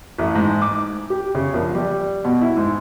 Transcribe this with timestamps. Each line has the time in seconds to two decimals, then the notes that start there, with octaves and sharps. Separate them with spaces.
0.18 A1
0.35 G#2
0.62 D6
1.10 G4
1.35 C#3
1.53 A#1
1.75 G3
2.24 B2
2.41 E4
2.56 G#2